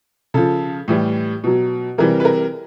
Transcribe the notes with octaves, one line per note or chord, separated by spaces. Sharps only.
C#3 F3 A4
A2 E3 G3
B2 F#3
C3 E3 G3 A#4
B4
A#4